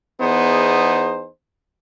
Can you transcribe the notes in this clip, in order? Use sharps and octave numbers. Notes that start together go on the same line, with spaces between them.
E2 B3 D#4 G#4 C5